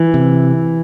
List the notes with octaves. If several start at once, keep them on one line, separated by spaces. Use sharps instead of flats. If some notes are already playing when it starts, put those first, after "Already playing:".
Already playing: E3
C3